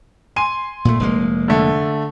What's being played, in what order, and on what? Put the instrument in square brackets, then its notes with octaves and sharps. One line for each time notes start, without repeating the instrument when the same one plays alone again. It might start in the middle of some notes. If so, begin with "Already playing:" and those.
[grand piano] G#5 C6 D#7
[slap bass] A#2 A3
F1 G#3 A#3
[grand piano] D3 A3